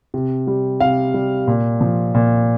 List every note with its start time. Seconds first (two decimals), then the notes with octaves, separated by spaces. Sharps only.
0.14 C3
0.47 G3
0.80 C3 F5
1.14 G3
1.47 A#2
1.81 F3
2.15 A#2